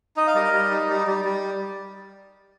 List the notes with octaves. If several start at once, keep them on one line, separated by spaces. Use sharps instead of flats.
D#4 D#5
F5
G3 A#4 D#5
G3
D#4
G3
G3
G3